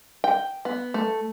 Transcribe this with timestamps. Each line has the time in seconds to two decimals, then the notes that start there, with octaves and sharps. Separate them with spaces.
0.24 G5
0.65 B3
0.94 A3